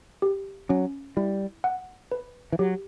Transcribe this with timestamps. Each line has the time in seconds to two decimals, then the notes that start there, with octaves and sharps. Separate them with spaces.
0.22 G4
0.69 F#3 C#4
1.17 G3 E4
1.64 F#5
2.12 B4
2.52 E3
2.59 F#3 G4